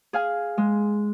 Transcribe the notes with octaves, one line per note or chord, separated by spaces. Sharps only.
G#4 F5 G#5
G#3